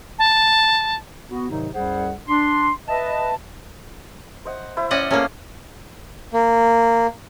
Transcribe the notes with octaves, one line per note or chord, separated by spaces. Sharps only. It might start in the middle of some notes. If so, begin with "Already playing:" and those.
A5
B3 F#4
G#2 C3 D#3 F#3 D#4
C2 F#2 G3 G#4 C5 F#5
D4 C6
B4 D#5 E5 A5
C5 D#5 F#5
E4 C5 E5
C#4 D5 D#5 F#5
A3 A#3 C#4 G#4 A#4
A#3